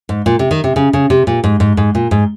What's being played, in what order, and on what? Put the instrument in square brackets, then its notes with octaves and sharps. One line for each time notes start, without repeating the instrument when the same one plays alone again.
[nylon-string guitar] G#2
A#2
C3
D#3
C3
C#3
C#3
C3
A#2
G#2
G#2
G#2
A#2
G#2